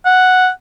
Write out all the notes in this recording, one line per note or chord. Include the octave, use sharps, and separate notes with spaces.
F#5